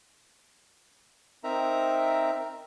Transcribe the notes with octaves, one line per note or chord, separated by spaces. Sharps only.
C4 D#4 A#4 E5 A#5